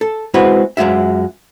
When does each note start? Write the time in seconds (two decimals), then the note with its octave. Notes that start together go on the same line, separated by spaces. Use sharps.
0.01 A4
0.34 G#3 C4 E4 F#4 B4
0.77 F#2 G#3 F4 F#4 E5